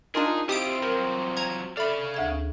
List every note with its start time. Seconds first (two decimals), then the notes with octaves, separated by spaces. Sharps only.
0.15 D4 D#4 F4 G#4 A#4
0.49 C4 E4 F4 G4 D#6 D7
0.82 F3 F#3 A#4
1.37 A#5 G#6
1.77 C#4 A4 D5 E5 F5 B5
2.14 D2 C#3 E5 G#6